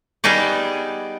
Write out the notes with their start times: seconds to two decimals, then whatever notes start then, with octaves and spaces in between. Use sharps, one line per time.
0.24 G3 B3 D#4 G#4 D5